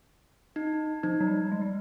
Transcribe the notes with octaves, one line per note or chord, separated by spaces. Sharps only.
D#4
F3 D#4
F#3
G3
G#3
G3